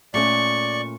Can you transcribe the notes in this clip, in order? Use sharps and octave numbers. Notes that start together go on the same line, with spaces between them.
A#2 A3 C#4 D5 C#6